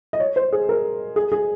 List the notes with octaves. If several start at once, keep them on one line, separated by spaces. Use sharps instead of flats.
D#5
C#5
C5
G#4
A#4
G#4
G#4